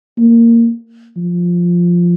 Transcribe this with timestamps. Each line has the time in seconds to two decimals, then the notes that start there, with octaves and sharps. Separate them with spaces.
0.19 A#3
1.17 F3